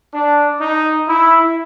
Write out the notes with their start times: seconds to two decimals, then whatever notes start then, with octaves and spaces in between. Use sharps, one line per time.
0.13 D4
0.61 D#4
1.08 E4